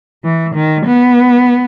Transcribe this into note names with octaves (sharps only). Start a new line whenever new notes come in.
E3
D#3
B3